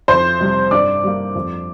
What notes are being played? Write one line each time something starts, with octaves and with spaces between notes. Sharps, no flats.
F2 C5 C6
C3 G3
G2 D5 D6
G3 A#3
F2